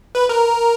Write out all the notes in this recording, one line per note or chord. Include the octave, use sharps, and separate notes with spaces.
B4
A#4